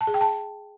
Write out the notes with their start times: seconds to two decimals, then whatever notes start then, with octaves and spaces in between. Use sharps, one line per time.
0.01 A5
0.07 G#4
0.14 G5
0.21 A5